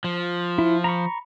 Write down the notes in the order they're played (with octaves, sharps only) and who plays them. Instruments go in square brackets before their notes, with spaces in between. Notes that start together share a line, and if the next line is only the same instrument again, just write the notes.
[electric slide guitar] F3
[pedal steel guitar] E4
A#5 B5 C#6